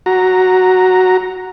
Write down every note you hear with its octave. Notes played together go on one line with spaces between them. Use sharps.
F#4 A#5